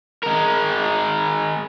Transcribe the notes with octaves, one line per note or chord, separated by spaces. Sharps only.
G#3 A#4